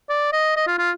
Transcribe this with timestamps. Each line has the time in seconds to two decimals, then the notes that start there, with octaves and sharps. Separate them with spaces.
0.10 D5
0.33 D#5
0.56 D#5
0.67 F4
0.79 F4